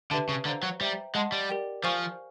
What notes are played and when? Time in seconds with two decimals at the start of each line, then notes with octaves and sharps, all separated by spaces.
0.11 D3 G4 B4 E5 A5
0.29 C#3
0.45 D3 C5 F5 A#5
0.63 F#3
0.80 G3 C5 E5 G5 A#5
1.15 G#3 D#5 F#5 A5 C6
1.32 G3
1.49 G4 A#4 D5 G5
1.83 F3 C5 F5 G#5 C#6 F6